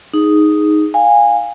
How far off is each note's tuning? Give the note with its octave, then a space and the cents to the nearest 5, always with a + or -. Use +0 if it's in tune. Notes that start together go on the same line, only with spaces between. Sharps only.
D#4 +0 G#4 +0
F5 +15 G#5 -20